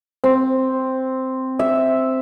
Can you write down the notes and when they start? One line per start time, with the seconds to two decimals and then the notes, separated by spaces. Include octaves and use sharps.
0.24 C4
1.59 E5